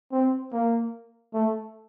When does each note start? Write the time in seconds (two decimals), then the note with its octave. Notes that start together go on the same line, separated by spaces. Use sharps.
0.12 C4
0.53 A#3
1.34 A3